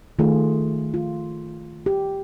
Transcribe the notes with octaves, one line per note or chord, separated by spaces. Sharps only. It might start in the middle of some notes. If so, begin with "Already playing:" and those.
D#3 A3 F4 G#4
F4
G4